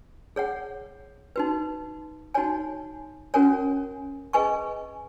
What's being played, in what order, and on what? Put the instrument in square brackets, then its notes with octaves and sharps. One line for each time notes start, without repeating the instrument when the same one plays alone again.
[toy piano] G#4 C#5 F#5
D#4 F#4 B4
D#4 F#4 C#5 G#5
C#4 F#4 A#4 C#5 G#5
G#4 B4 D#5 G#5 C#6